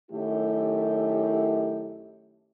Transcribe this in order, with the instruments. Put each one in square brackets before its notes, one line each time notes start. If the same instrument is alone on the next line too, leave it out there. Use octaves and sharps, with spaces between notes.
[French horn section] F#2 D#3 A3 E4 G4